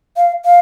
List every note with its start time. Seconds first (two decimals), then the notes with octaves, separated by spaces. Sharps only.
0.17 F5
0.45 F5